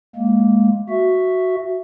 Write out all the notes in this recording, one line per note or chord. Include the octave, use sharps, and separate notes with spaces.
G#3 A#3
F#4 E5